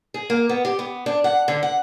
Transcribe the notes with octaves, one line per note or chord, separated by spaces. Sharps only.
G#4
A#3
B3
G4
B3
D4
F#5
D3
F#5